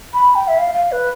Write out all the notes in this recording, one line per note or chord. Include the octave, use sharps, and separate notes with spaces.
B5
G5
E5
F5
F5
B4